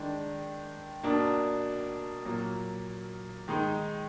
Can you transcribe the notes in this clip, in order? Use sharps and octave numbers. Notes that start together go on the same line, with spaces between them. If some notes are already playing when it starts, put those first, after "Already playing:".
Already playing: D#3 G#3 D4
B2 A#3 D4
A#2 F#3 A#3
D#3 G#3 D#4